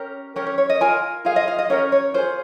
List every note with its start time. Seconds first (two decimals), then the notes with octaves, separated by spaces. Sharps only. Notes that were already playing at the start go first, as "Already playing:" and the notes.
Already playing: C#4 G4 A#4
0.36 C#4 G4 A#4 C#5
0.47 C#5
0.58 C#5
0.69 D#5
0.81 F4 A#4 G#5
1.25 F4 G#4 F5
1.36 D#5
1.48 F5
1.59 D#5
1.70 C#4 G4 A#4 C#5
1.92 C#5
2.14 F4 G#4 C5